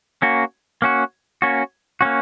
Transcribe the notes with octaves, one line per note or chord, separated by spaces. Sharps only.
A#3 C#4 F#4
A#3 C#4 F#4
A#3 C#4 F#4
A#3 C#4 F#4